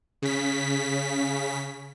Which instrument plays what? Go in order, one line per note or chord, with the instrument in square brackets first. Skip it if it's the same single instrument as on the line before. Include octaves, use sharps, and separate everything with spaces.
[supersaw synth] C#3 B6